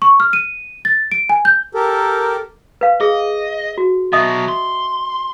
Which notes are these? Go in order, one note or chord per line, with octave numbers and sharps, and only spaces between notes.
C#6
F6
D#7
A6
D7
G#5
G6
G4 A4 A#4
B4 F5
G#4 D#5
F#4
B2 F#3 D#5 E5 D#6
C6